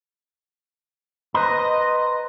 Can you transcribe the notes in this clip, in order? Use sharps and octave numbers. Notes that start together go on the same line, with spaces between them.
B4 C5 D#5 A#5